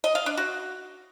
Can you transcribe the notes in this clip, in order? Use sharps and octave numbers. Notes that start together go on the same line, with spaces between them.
D#5
F5
D4
F#4